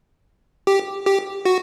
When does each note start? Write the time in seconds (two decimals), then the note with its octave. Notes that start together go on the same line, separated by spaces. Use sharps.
0.67 G4
1.06 G4
1.45 F#4